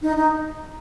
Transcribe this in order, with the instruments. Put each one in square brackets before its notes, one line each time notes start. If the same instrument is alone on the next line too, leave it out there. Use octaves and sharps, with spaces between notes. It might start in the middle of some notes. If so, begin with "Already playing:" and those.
[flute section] D#4
D#4